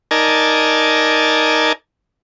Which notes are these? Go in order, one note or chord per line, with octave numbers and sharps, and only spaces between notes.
D#4 A#4 D5 G#5 A5